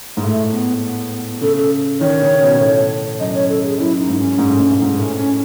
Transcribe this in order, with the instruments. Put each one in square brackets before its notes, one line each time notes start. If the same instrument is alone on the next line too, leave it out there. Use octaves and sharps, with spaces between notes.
[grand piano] G#2
[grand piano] A2 [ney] A3
[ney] B3
B3
[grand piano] C#3 [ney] A4
[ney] A4
[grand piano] D#3 [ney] C#5
[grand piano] C#3
B2
B2
A2
[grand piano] F#2 [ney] D#5
[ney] C#5
A4
G#4
[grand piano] F#2 [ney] E4
[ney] D#4
[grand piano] G#2
[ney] C#4
[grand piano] G#2
A2
G#2
A2
G#2
[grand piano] A2 [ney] C#4
[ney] C#4